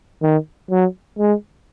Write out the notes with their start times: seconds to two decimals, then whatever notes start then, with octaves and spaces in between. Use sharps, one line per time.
0.23 D#3
0.71 F#3
1.19 G#3